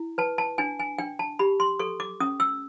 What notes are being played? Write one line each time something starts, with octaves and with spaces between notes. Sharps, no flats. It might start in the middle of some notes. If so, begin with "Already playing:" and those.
Already playing: E4
B4 A5
A5
D4 G#5
G#5
D4 G5
A5
G4 B5
C6
A4 C#6
D6
C#4 D#6
E6